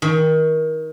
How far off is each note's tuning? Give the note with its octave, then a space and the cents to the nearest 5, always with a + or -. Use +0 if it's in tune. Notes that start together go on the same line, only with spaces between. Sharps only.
D#3 +25